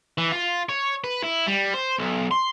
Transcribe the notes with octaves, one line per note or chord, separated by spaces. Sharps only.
E3
F4
C#5
B4
E4
G3
C5
B1
C6